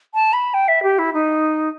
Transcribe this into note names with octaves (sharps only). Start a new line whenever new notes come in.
A5
B5
G5
E5
G4
E4
D#4